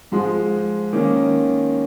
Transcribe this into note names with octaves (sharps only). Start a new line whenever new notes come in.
G#2 F3 G#3
D#3 A#3 C#4